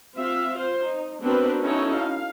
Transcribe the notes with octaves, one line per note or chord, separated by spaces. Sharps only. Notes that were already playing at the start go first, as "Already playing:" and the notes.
C4 F4 E5 F5
F4 C5
D#4
B3 C4 D4 F#4 A#4 B4
C#4 D#4 E4 F#4 A4 C#5
F5